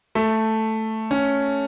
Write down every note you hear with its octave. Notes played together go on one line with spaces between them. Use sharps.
A3
C#4